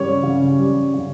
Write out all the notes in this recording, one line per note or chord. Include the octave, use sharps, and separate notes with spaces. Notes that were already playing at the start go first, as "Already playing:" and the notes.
Already playing: C#3 G3 C#5
C#3
G3
C#3